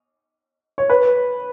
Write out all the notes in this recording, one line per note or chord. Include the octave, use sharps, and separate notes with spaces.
C#5
B4